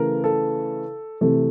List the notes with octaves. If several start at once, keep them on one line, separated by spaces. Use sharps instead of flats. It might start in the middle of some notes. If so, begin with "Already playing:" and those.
Already playing: C#3 E3 A3 A#4
A4
C3 E3 A3 A4